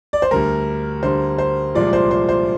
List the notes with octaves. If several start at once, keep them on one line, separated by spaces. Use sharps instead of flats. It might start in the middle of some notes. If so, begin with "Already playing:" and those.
D5
C5
D2 D3 G3 A#4
D2 D3 G3 C5
C5
C2 A#2 F3 G#3 D5
C5
C5
C5